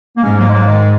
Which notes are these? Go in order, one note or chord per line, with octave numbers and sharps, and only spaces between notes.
A#3
G#2 G#3 C#4
F#3 A#3
G#3
F#3 A#3
D#3 G#3